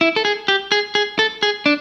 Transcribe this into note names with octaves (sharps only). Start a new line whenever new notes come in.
E4
A4
G#4
G4
G#4
G#4
A4
G#4
D4